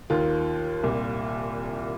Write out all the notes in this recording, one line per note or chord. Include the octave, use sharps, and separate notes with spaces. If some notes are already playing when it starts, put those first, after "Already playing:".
D#2 D#3 F4
C2 A#2